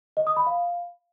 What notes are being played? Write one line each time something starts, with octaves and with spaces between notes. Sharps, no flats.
D#5
D#6
B5
F5